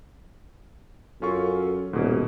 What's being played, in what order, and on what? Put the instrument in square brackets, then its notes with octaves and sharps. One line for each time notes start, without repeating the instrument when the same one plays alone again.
[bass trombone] F#2 [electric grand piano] C#4 F4 C#6 [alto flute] A4
[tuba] D#1 [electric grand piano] G#2 B2